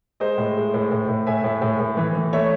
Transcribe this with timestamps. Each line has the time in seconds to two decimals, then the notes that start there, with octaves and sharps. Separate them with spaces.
0.20 G#3 C5 D#5
0.38 A2
0.56 G#3
0.74 A2
0.92 A2
1.08 A2
1.26 A2 E5 G#5
1.44 A2
1.62 A2
1.79 A2
1.97 E3
2.15 E3
2.33 A3 C#5 E5